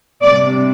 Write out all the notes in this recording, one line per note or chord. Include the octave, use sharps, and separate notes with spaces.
C3 G3 D4 D5